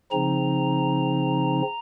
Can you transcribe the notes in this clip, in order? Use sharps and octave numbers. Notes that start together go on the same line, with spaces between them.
C#3 F3 C4 D#4 A#5